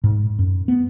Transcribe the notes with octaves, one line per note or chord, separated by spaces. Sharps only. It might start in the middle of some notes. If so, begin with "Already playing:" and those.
G#2
F#2
B3